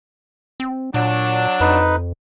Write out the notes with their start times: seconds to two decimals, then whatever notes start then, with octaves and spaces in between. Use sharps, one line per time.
0.60 C4
0.94 A#2 F#3 D4
1.60 F2 D#4 B4